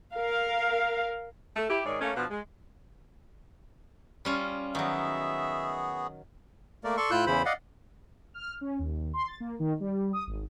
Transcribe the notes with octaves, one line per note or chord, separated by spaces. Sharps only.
A#4 F5
A3
E4 G4
G#2 D#3 G#4 C#5 D5
A3 A#3 C#4
B2 F3 D4 B4 F#5
G#3
G3 C#4 F4
D#3 F#3 B3 F#4 G#4 E5
A3 A#3 A#4 D5
A4 D5 C6 C#6
A2 E4 F4 E6 F#6 G6
E2 C#3 E3 E4 C5 B5
D5 D#5 F5 F#5
F6
C#4
D#2
C6
A6
A#3
D#3
G3
D#6
G#1